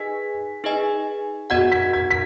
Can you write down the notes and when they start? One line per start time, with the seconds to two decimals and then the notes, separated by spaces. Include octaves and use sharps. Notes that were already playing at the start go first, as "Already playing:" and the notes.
Already playing: D#4 G#4 B4 D#5 G#5 B6
0.64 D#4 G#4 B4 D#5 G#5
1.50 B3 F#4 D#5 F#5 G#6
1.72 B6
1.93 G#6
2.11 B6